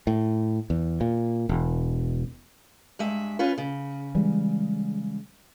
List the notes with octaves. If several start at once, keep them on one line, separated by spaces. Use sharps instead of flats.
A2
E2
A#2
E1
G2 G#3 E5
C#4 F4 B4
C#3
E3 G3 G#3